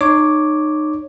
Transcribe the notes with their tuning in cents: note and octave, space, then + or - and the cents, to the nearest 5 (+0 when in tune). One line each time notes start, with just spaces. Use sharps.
D#4 -30 C#5 +0 D6 +0